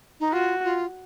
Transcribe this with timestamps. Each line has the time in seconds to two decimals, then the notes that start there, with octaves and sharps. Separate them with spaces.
0.20 D#4
0.33 F4 F#4
0.64 F4